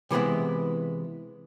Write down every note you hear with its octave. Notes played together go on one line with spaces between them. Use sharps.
C3 E3 G#3 B3 E4